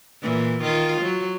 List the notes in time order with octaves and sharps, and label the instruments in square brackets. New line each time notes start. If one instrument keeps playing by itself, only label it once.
[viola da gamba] A#2 E3
D#3 F4
F#3